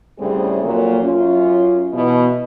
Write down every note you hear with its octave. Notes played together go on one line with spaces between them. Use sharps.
D2 A2 C#3 G3 C4 G#4
F2 A#2 F#3 A#3
F#2 C#4 F4
B2 E3